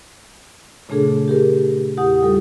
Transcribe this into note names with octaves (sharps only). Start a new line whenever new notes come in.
A#2 C#3 A3 D4 G#4 A4
G4 G#4 A#4
E2 G4 F#5 D#6
G3 F4 A4